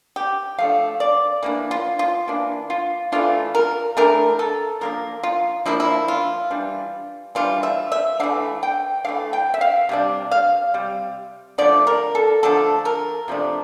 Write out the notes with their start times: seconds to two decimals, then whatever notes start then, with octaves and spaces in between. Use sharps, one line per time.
0.16 G4
0.58 F3 A3 D4 F5
1.00 D5
1.43 E3 A#3 D4
1.71 F4
1.99 F4
2.27 E3 A#3 D4
2.70 F4
3.12 E3 A3 D4 F4
3.55 A#4
3.97 E3 A3 D4 A#4
4.39 A4
4.81 F3 A#3 D4 A#4
5.23 F4
5.66 F3 A#3 D4 E4
5.80 E4
6.08 F4
6.51 E3 G3 D4
7.35 E3 G3 D4 F4
7.63 E5
7.92 E5
8.20 E3 A3 D4 F5
8.63 G5
9.04 E3 A3 D4 F5
9.33 G5
9.54 E5
9.61 F5
9.89 C3 G3 D4
10.31 F5
10.74 C3 G3
11.58 D3 F3 A3 D4 D5
11.87 A#4
12.15 A4
12.43 D3 F3 A3 D4 A4
12.85 A#4
13.28 C3 F3 A3 D4